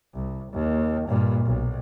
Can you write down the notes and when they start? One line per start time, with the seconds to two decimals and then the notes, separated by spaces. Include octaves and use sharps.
0.14 C2
0.52 D#2
1.09 G2 A#2
1.45 B1